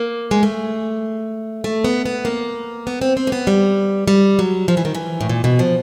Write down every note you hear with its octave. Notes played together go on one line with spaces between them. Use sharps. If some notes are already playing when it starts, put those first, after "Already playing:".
Already playing: A#3
G#3
A3
A3
B3
B3
A#3
B3
C4
C4
A#3
B3
G3
G3
F#3
F3
E3
D#3
E3
A2
A#2
B2
F3